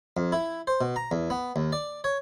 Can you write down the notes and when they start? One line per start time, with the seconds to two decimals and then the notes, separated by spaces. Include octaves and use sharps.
0.17 F2
0.32 E4
0.67 C5
0.81 B2
0.96 A#5
1.11 E2
1.30 B3
1.56 D#2
1.72 D5
2.04 C#5